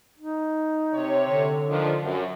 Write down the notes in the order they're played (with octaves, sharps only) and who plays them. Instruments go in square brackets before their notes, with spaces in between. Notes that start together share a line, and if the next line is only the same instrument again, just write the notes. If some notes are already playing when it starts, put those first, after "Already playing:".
[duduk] D#4
[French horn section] C3 C#5
[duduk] D3
[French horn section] D#3 F3 D4
F#2